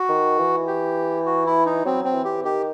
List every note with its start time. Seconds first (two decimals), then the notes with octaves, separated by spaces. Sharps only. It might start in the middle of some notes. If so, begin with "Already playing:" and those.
Already playing: F#4
0.09 D#3
0.38 E3
0.67 G4
1.26 F#4
1.46 E4
1.66 D#4
1.85 F#3 C4
2.04 C4
2.14 E3
2.25 G4
2.44 D#3 G4